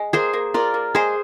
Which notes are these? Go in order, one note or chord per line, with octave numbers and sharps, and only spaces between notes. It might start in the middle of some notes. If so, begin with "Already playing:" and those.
Already playing: G#3
A#3 G#4 C5
A#3
F4 A#4 D5
A#3
G#3 G#4 C5